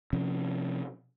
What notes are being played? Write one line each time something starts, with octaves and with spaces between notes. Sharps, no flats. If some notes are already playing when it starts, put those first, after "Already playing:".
C3 F3 C#4